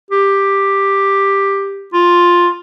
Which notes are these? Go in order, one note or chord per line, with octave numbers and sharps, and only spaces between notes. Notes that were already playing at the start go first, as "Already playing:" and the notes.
G4
F4